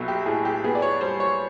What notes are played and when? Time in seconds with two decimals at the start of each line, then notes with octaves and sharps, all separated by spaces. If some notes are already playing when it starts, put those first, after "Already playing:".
Already playing: B1 F#3 E4 F#4
0.08 G4
0.26 A2 G#4
0.45 G4
0.64 B3 G#4
0.75 D5
0.82 C#5
1.01 G3 C5
1.20 C#5